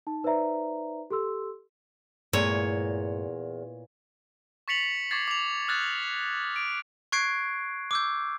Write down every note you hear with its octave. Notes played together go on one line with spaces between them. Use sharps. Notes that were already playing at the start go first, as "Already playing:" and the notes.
D#4 A5
D#4 B4 C5 D5 E5 A#5
G4 A4 C6 E6
E2 G2 A#2 A3 C#5
C#6 A6 B6 C#7 F7 F#7
C#6 D6 G#6 A6 C7
D6 F7
D#6 F6 F#6 G#6 A6
D7
C#6 F#6 G#6 C7 D7
D6 E6 G6